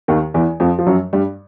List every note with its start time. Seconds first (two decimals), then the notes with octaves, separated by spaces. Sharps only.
0.08 D#2 D#3
0.34 E2 E3
0.60 F2 F3
0.79 F3
0.87 F#2 F#3
1.13 G2 G3